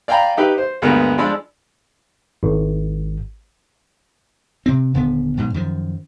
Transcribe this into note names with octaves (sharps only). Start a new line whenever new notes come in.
D5 F5 G5 G#5 A#5 B5
D#4 G4 B4
C5
D2 G2 G#3 A#3 B3
F3 G#3 D4 B5 E6
G#1
C3 C4
D#1 D3 B3
A#1 G#2 B2
F#2 D#3 F3